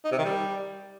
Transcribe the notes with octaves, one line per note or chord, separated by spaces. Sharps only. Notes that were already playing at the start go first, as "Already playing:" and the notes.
D#4
C3
D#3
G3